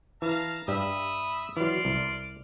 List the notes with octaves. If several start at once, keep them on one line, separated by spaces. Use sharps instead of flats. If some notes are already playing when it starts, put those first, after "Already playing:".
E3 F5 A5 A#5
G2 G3 E5 B5 D#6
E3 F#3 D5 C6 F6
C2